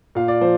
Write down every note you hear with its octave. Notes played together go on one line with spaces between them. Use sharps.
A#2 F5
D5
F3 C5